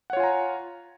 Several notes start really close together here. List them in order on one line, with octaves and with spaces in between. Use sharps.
F#5 C#5 F4 G#5 A#5